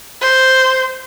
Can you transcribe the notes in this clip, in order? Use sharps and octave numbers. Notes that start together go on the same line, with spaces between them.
C5